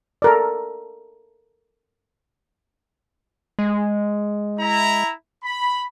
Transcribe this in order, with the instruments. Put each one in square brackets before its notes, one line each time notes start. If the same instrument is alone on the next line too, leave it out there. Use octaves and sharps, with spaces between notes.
[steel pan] A4 A#4 D5
[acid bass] G#3
[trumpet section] E4 A#5
B5